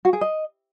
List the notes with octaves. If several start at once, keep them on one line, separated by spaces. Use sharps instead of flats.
F#4
G#4
D#5